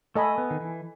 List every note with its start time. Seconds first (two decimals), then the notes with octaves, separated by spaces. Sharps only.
0.15 A3 A4 D#5 G#5 B5
0.38 B3
0.50 D#3
0.60 E3